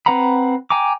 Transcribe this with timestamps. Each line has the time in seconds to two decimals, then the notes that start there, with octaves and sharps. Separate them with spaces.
0.06 C4 B4 F#5 A#5 B5
0.70 G5 G#5 A#5 D6